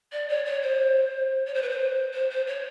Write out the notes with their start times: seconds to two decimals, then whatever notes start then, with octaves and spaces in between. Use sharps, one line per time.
0.12 D5
0.28 C#5
0.45 C#5
0.62 C5
1.46 C#5
1.54 C5
1.61 B4
1.69 C5
2.13 C5
2.29 C5
2.46 C#5